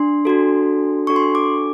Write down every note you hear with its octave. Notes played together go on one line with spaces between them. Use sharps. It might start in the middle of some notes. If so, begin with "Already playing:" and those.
Already playing: D4 C6
D4 F#4 A4
D4 F#4 A4 C#6
C6
C#6
D6